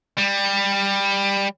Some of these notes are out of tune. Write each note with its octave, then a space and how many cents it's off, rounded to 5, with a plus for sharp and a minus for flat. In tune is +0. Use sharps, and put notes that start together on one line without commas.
G3 +15